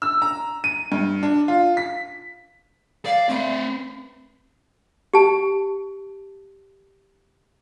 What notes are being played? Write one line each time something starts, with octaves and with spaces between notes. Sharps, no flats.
E6
A#5
D#7
G2
D4
F4
B6
D5 F5
A3 C4 B4
G4 A5